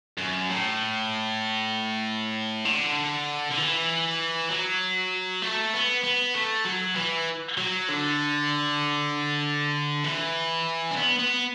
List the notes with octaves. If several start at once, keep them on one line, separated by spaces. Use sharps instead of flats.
F#2
A2
D3
D3
E3
F#3
A3
B3
B3
A3
F#3
E3
F#3
D3
E3
D4
B3
B3